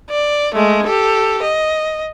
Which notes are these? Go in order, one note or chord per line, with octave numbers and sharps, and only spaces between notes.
D5
G#3 A3
G4 A4
D#5